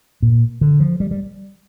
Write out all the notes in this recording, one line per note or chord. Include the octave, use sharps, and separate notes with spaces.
A#2
D3
F3
G3
G3